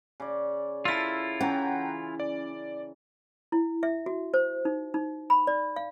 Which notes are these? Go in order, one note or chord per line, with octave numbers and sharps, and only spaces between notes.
C#3 D5
E4 F4 A4 A#4 E6 A6
E3 C#4 F#5 G5 A#5
D5
E4
E5
F#4
C5
D#4
D#4
B5
D5
F5